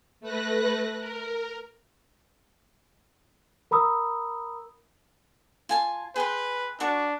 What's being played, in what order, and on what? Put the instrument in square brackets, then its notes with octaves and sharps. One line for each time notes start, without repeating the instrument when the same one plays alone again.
[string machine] A3 B4 F#6 A#6
A#4
[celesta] A#4 A#5 B5 D#6 E6
[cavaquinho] F4 G#5 A5
[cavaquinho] G#4 G5 C6 [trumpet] B4
[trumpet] D4 [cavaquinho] F#4 A5 C#6